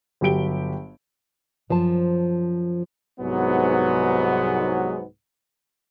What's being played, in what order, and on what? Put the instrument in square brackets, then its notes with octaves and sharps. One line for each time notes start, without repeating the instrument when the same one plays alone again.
[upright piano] G1 F#3 G4 D7 G7
[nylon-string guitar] F#2 F3 C5 A5
[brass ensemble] C2 G#2 F#3 B3